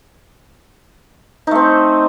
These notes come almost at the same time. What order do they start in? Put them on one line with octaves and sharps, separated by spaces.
D#4 A3 C4